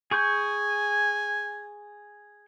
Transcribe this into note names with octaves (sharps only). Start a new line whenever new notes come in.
G#4 G#5 C#6 G6